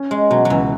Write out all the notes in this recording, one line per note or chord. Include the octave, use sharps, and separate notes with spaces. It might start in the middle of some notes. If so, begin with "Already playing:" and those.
Already playing: C#4
G#3 C#4
B2 F#3
F#3
C#2 E3